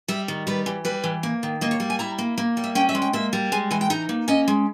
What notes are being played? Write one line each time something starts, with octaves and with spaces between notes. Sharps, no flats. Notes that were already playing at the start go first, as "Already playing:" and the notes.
G3 E5
D#3
G3 B4
E3
G3 B4
E3
A#3
D#3
A#3 D#5
C#5
G3
G#5
E4 A#5
A#3
A#3
G3
E5
C#4 G5
E5
G#3
G5
A#3 E5
G3
G#3 G#5
E3 G#5
G5
D#4 A#5
A#3
C#4 D#5
G#3